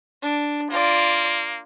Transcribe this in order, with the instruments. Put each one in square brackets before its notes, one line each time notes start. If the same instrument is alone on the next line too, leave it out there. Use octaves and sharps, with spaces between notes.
[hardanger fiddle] D4
[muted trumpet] A#3 [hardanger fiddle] F4 D5